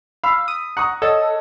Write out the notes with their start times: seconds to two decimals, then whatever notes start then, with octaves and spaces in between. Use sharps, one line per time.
0.24 F5 B5 E6
0.48 D#6
0.77 F#5 A#5 C#6 D#6
1.02 A4 C#5 D#5 F#5